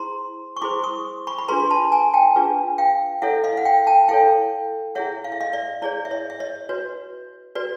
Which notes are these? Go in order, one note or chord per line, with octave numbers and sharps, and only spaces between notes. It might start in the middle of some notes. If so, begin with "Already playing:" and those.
Already playing: E4 G#4 C5 A#5 C6
C#6
E4 G#4 C5 C6 D6
C#6 D#6
B5 C#6
B5
D4 F4 G#4 B4 A#5 C6
C6
A5 B5
G#5 A#5
G5 A5
D4 F4 G#4 B4
F5 G5
E4 A4 C#5 E5 F#5
D#5 F5
F#5
F5 G5
G5 A5
E4 A4 C#5 F5 G5
E4 G#4 C#5 E5 F#5
F5
E5
D#5 F5
D5 E5
E4 G#4 C#5 D5
E5
C#5 D#5
E5
C#5 D#5
F#4 B4 C#5
F#4 B4 D5